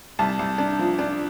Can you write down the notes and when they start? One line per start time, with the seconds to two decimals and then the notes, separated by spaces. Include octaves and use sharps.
0.19 C2 A5
0.39 C2
0.58 D4
0.79 F3
0.99 D4